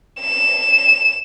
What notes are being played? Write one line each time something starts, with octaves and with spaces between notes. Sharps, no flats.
E7